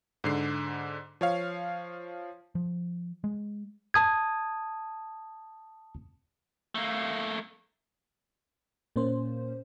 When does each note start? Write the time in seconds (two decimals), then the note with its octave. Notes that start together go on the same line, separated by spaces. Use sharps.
0.24 G#2 D3 C7
1.21 F3 C#5 F5
2.55 F3
3.24 G#3
3.94 A5 D#6 G#6
6.75 A3 A#3
8.96 A#2 A#3 C#4 C5